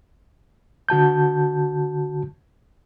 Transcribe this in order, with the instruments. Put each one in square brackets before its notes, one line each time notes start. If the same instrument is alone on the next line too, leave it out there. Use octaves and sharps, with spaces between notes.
[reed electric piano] D3 F#4 A5 G6